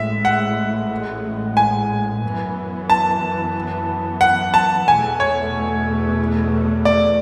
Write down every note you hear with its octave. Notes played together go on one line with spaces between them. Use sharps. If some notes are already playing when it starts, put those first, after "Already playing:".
Already playing: A1 A2 G#3 E5
F#5
G#5
F#2 E3 B3
A5
F#5
A5
E2 B2 A3 G#5
C#5
D5